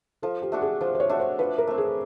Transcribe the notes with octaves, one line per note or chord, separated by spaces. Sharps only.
F3 A4
G4
A3 D4 F#4
G#4
F3 C5
C5
C#5
A3 D4 F#4
C5
F3 B4
A#4
A3 C4
G#4